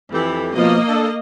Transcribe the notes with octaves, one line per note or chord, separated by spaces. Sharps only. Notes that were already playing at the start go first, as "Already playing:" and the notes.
F2 E3 G4 A4
B2 F3 A#3 D#5
D4 A4